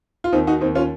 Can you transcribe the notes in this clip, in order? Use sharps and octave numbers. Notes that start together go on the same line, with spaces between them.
F4
D#2 C4 D#4
D#4 F#4
D#2 C4 D#4
C#4 F4